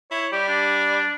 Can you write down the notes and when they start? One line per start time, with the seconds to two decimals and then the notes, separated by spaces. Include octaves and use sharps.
0.11 E4 C#5
0.32 G3 G4
0.49 D4